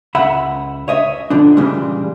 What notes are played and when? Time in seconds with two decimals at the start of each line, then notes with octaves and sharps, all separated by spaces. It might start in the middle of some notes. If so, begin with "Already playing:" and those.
0.15 C#2 E5 F#5 B5
0.88 C#5 D#5 E5
1.30 B2 D3 F3 D4
1.57 A#2 C#3 E3 G3 G#3